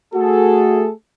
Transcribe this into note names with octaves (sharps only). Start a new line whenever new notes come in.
A3 F#4 G#4 A4